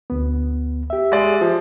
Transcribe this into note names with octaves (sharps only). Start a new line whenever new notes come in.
D2 B3
G4 E5
G#3 D5
F3